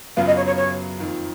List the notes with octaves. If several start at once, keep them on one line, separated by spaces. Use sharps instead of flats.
F#2 C#3 F#3 B3 F4 F5
D#5
C#5
C#5
C#5
F2 D#3 A#3